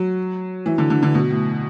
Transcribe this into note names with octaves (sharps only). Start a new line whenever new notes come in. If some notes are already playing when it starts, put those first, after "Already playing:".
Already playing: F#3
E3
D3
D3
D3
B2
A2